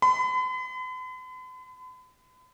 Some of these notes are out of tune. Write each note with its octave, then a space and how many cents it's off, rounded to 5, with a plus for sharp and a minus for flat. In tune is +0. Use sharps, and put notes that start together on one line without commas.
B5 +45